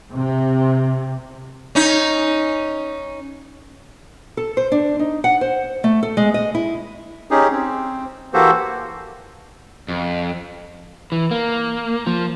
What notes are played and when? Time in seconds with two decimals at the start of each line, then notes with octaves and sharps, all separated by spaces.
0.12 C3
1.75 C#4 D#4
4.37 A4
4.57 C5
4.72 D4
4.99 D#4
5.24 F#5
5.41 C5
5.84 A3
6.03 A4
6.17 G#3
6.34 D#5
6.55 E4
7.31 C#4 D#4 G4 G#4
7.52 C4
8.33 E3 A#3 F#4 G4 A4 C5
9.88 F2
11.12 E3
11.31 A#3
12.07 F3